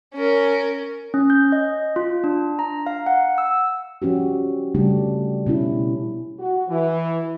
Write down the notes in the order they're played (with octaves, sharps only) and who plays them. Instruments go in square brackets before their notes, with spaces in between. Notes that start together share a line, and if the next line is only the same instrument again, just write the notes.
[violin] C#4 A#4
[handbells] C#4
G6
D#5
F4
D4
A#5
F5
F#5
E6
[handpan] F3 C#4 F#4 G4
C#3 G3 A3 D4 G4
B2 C#4 E4
[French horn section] F#4
E3